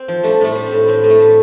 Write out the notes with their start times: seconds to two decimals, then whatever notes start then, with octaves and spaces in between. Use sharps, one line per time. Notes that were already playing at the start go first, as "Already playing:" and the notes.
Already playing: C4
0.08 F3
0.23 G3 A3 D4
0.40 A2 A3 D4
0.55 G3
0.66 C4
0.72 A2
0.88 A2 C4
1.03 A2
1.10 A3
1.20 G3